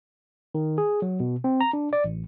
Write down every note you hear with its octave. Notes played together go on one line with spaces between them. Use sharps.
D#3
G#4
F#3
B2
C4
A#5
D4
D5
A1